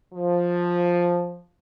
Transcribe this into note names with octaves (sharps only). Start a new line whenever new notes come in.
F3